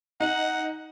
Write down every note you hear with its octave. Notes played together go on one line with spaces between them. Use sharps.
D#4 F#5